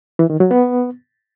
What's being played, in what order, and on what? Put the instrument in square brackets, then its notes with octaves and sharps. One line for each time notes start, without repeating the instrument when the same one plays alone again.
[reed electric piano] E3
D#3
F#3
B3